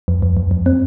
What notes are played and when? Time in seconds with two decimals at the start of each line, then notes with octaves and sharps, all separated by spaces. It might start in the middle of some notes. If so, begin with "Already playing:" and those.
0.08 F2
0.22 F2
0.37 F2
0.51 F2
0.66 C4